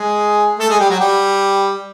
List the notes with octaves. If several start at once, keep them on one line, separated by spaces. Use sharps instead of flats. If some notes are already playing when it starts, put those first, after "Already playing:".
Already playing: G#3 G#4
A3 A4
G#3 G#4
G3 G4
F#3 F#4
G3 G4